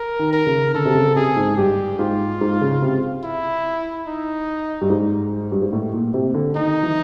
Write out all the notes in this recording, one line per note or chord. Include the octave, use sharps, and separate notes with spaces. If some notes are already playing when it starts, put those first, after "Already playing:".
Already playing: A#4
D#3
A#4
C#3
D3 A4
C3
C#3
C3 G#4
G#2
G2 G4
G#2 F4
G#2
C#3
C3
E4
D#4
G2
G#2
G2
G#2
A2
A#2
C3
D3
D#3 D#4
E3